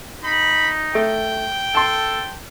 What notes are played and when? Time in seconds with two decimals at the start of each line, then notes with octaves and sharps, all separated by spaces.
0.24 D#4 B5
0.95 A3 G5
1.75 A4 A5 C6